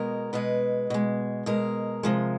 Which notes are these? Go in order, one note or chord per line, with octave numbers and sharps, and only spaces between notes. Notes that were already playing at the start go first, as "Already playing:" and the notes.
Already playing: B2 G#3 A#4
B2 G#3 B4
B2 G#3
B2 G#3 A#4
C3 F3 G#3